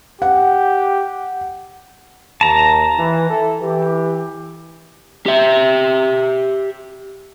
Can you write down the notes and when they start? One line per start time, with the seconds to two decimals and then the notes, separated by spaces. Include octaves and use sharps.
0.22 G4 F#5
2.41 D#2 A5 A#5
2.97 E3
3.29 E4 A4
3.60 E3 G4
5.26 G4 E5